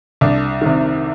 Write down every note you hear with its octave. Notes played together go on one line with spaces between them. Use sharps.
C2 D4
C3 D#3